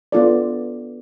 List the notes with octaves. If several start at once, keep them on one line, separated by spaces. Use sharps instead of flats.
B3 D4 F4 A4 D5